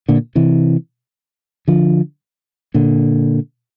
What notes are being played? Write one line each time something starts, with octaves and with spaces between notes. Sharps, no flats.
A#2 D3
C3 E3
D3 F3
A#2 D3